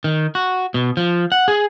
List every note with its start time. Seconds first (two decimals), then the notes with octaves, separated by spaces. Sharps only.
0.04 D#3
0.35 F#4
0.74 B2
0.97 F3
1.32 F#5
1.48 G#4